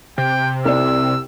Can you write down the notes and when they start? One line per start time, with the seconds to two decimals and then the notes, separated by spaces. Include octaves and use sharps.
0.18 C3 G5
0.65 C2 D5 E6